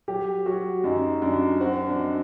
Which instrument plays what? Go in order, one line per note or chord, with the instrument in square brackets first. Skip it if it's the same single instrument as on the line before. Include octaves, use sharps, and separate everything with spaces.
[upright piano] F#3 [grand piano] G4
[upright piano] F#3 [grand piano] F#4
[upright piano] F#2 [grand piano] D#4
[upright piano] F#2 [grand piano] D4
[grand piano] C4 [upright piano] F#4
[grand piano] D4
[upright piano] D#4